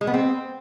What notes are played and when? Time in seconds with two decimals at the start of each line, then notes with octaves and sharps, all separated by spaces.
0.01 G#3
0.07 B3
0.14 C4